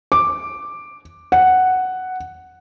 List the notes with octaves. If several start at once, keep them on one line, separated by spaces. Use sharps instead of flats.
D6
F#5